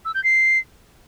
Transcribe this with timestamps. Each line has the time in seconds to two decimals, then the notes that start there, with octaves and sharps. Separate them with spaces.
0.05 E6
0.15 G6
0.24 C7